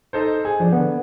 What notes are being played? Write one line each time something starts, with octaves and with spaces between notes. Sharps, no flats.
D#4 A4 C5
G#4
F3 D4
D3 B3